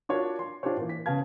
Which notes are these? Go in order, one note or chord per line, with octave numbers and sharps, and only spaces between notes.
D4 F4 F#4 A#4 C#5
C6
D4 F4 G4 C5 C#5
A#2 E3
B6
C#3 B3 F5 A5 G#6